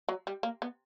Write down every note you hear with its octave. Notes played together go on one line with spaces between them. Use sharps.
F#3
G3
A#3
B3